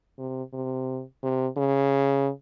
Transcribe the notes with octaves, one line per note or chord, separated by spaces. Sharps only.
C3
C3
C3
C#3